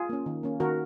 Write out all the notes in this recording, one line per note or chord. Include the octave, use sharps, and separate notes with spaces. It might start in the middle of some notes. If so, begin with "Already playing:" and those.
Already playing: F4 G#4
A#3 C#4
D#3
A#3 C#4
D#3 F#4 A#4